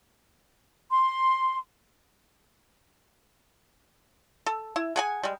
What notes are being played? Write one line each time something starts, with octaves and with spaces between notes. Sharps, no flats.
C6
A4
E4
G#4 F#5 G#5
G3 G#3